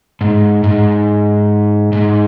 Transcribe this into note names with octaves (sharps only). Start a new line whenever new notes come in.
G#2
G#2
G#2